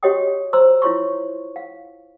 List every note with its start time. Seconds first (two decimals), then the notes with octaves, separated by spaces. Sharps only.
0.03 F#4 G4 C#5 D#5 G5 D#6
0.53 C5 A#5 C6 E6
0.82 E4 F4 C#5 C6 C#6
1.56 F5